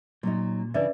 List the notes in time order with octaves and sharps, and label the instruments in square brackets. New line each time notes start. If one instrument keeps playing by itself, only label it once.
[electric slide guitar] A#2 [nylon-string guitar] F#3 C#4 D#4
[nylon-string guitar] C#3 E3 D4 [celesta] B4 D5 E5